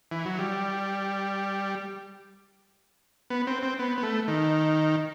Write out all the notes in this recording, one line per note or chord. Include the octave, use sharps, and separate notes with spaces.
E3
F#3
G3
B3
C4
C4
B3
B3
A3
D#3